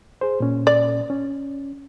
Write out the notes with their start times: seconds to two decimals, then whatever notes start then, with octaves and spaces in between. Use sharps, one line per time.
0.21 G#4 C5
0.40 A#2 C#4
0.67 D5
1.10 C#4